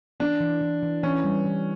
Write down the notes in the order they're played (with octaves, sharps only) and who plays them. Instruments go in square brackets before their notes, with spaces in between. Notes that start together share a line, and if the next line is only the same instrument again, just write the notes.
[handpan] E3 [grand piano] D4
[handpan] E3
E3
E3
[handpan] E3 [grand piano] C#4
[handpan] G3
E3